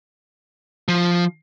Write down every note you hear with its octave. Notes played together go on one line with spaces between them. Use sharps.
F3